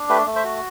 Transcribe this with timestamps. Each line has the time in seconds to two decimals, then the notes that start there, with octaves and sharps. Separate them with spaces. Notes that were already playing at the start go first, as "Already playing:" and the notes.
Already playing: D4
0.09 A3 G4 B4
0.26 A3
0.36 C5 E5
0.44 F#4